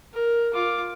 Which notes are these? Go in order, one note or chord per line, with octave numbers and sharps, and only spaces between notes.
A#4
F4 D6